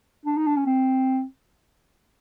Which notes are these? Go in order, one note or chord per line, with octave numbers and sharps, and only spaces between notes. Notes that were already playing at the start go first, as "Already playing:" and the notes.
D4
D#4
D4
C#4
C4